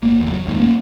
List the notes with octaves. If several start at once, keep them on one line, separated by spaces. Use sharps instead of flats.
G1 A#3
F#1 E2
F#3
F1 D#2 G#2
A#3 C#4